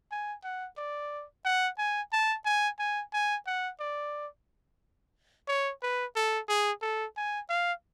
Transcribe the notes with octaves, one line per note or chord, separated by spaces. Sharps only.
G#5
F#5
D5
F#5
G#5
A5
G#5
G#5
G#5
F#5
D5
C#5
B4
A4
G#4
A4
G#5
F5